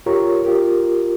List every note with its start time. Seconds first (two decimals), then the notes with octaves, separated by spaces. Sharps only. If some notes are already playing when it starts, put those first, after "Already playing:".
0.06 F4 G4 A#4 C#5 A#5 C#6
0.44 F4 G4 A#4